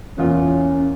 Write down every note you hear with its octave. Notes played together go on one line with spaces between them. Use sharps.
E2 A#2 C#4 F4